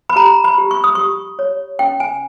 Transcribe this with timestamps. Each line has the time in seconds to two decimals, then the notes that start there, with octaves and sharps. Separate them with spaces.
0.09 B5
0.16 G4 A#5
0.44 B5
0.58 G4
0.71 C#6
0.84 D#6
0.95 G4 C#6
1.39 C#5
1.79 C#4 G5
2.00 G#5